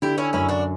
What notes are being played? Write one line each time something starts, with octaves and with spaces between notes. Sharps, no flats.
D3 E4 G4
C#4 E4
F#2 C#4 E4
D4 F#4